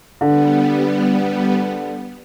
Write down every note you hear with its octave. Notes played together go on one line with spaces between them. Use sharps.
D3 G3 B3